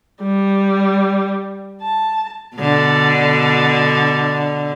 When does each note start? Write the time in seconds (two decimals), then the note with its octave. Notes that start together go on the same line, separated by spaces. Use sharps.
0.22 G3
1.81 A5
2.57 B2 D3